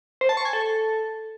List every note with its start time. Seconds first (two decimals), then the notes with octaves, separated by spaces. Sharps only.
0.21 C5
0.29 A5
0.37 C#6
0.45 G#5
0.53 A4